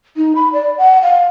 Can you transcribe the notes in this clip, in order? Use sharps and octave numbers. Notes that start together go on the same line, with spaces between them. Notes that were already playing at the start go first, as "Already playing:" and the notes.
D#4
B5
D5
F#5
F5